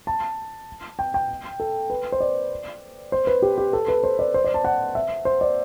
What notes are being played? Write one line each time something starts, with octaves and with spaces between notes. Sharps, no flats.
A5
G5
G5
A4
B4
C5
D5
C5
B4
G4
G4
A4
B4
C5
D5
C5
D5
A5
F#5
E5
C5
D5